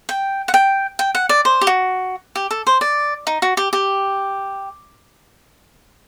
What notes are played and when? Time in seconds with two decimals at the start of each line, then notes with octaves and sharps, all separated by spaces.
0.09 G5
0.48 F#5
0.54 G5
0.99 G5
1.15 F#5
1.29 D5
1.45 C5
1.61 G4
1.67 F#4
2.35 G4
2.51 A4
2.67 C5
2.81 D5
3.27 D#4
3.42 F#4
3.57 G4
3.73 G4